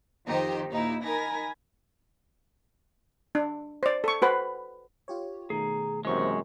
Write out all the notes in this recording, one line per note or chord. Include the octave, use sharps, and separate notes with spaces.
F2 D#3 D#4 G4 C5
D#2 A#2 D#4 E4
D#4 A#4 G#5 B5 A#6
D4
C5 D5
A4 C#6
F#4 B4 C5 B5
F4 G4 C#5
B2 D#3 A3 G#4 A#5
F#2 C3 E3 G#3 A#3 C5 C#6